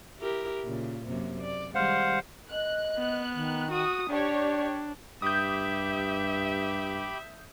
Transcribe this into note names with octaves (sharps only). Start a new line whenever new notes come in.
E4 G4 A#4
A#2 C#3
F#2 C3 A#3
D5
D#3 G3 G#3 C5 F5 F#5
D#5 F#6
B3
D#3
F#4 D#6
D4 G4 C#5 D5
G2 G4 E5 B5 D6 D#6 G6